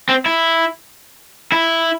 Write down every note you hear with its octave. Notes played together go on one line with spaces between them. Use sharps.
C4
E4
E4